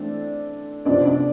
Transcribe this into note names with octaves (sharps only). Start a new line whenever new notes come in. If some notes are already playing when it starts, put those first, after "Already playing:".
Already playing: E3 A3 C4 D4 D5
C3 F3 B3 D4 D5
D4 D5